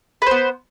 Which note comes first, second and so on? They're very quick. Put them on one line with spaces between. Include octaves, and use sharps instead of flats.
B4 C5 B3